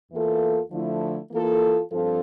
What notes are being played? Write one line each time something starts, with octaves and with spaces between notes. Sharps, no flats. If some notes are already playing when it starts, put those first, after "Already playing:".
E2 E3 A#3 F4 A4
D3 F3 A3 E4
E3 A#3 F4 A4
G2 F3 C4 F4 A4